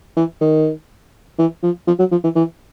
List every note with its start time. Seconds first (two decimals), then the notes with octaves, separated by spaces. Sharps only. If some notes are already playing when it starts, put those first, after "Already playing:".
0.17 E3
0.41 D#3
1.39 E3
1.63 F3
1.87 F3
1.99 F#3
2.11 F3
2.24 E3
2.36 E3